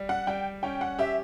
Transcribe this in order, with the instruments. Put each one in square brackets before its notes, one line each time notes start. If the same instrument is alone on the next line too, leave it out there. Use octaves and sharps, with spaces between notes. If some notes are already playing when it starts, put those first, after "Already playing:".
Already playing: [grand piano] G3
[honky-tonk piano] F#5
[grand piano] G3 [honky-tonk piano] G5
[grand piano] C#4 [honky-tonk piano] G5
[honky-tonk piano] F#5
[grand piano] G4 [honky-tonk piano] E5